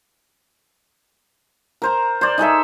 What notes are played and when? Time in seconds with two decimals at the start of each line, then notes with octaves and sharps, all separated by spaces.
1.82 A#4 C5 A#5
2.21 C5 D5
2.38 D#4 G#4 A4 E5